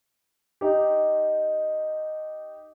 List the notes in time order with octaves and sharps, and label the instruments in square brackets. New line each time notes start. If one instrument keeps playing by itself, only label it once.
[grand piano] D#4 G4